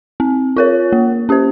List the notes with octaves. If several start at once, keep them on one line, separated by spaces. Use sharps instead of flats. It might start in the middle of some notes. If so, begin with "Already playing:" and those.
C4
F4 A#4 C#5
A#3
C#4 G4 C5